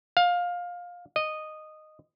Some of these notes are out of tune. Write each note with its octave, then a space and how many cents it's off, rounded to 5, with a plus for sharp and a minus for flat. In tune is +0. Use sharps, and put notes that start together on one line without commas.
F5 +20
D#5 -10